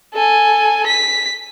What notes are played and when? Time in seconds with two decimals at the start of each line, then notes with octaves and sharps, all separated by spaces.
0.14 A4 G#5
0.86 B6